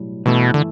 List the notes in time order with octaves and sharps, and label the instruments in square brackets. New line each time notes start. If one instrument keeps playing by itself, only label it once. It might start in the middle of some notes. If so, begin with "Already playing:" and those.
Already playing: [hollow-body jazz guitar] B1 A2 G3
[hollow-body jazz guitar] G2 E3 A3 E4 [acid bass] B2
[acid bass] D3